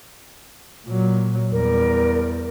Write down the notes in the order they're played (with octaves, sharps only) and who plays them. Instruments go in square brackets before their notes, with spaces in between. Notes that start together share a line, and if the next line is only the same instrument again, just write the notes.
[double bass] A#2 F#3
[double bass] E2 G3 [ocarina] A#4